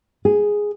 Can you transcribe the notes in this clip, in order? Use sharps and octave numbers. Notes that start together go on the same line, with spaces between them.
G#4